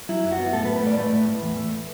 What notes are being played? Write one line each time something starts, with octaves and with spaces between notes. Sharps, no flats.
F#3 E4
F#2
F#4
B3
A2 A4
B4
A2
B4
A3 D5
A3 B4
A2
A2
E2
A3